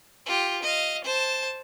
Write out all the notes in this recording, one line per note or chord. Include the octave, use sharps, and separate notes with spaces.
F4 G4
D#5 F5
C5 A5